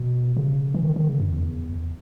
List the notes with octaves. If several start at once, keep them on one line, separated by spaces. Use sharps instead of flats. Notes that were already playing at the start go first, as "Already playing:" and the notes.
Already playing: B2
C#3
E3
D#3
D#3
C#3
F#2
E2